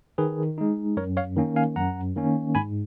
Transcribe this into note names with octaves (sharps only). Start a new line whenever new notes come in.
D#3 G#4 B4
G#3 D#4
F#2 A#4 C#5
C#5 F5
D#3 A#3 C#4
F5 G#5
F#2 F#5 A#5
D#3 A#3 C#4
G#2 G#5 B5